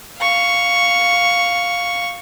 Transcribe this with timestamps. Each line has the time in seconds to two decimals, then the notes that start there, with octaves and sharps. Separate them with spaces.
0.20 F5 C#6